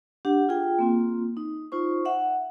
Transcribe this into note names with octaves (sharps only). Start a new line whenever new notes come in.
D4 G4 F#5
F4 G#4 G5
A#3 C4 F4
D#4
D#4 F4 C5 C#6
E5 F#5